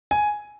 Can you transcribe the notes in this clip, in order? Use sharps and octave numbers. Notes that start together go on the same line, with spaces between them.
G#5